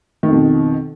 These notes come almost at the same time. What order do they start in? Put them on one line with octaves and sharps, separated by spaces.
D#3 F2 B2